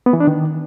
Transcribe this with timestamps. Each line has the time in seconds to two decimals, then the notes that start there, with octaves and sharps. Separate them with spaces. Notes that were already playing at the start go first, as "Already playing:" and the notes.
0.06 B3
0.13 E3
0.20 D4
0.27 D#3